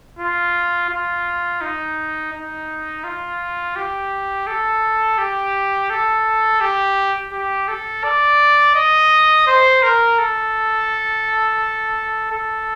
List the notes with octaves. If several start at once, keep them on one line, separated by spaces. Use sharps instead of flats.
F4
F4
D#4
D#4
F4
G4
A4
G4
A4
G4
G4
A4
D5
D#5
C5
A#4
A4
A4